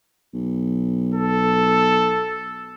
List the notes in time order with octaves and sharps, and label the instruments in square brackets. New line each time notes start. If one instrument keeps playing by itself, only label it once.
[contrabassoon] B1
[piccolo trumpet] A4